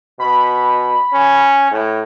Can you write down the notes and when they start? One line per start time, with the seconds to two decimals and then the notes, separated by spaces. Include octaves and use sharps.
0.19 B2 B5
1.13 C#4
1.71 A2